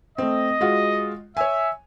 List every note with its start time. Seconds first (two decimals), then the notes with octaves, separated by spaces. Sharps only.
0.18 A3 C4 D#5
0.61 G#3 F4 F#4
1.37 C#5 E5 G#5